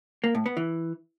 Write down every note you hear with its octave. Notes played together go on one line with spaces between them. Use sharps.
A#3
A2
B3
E3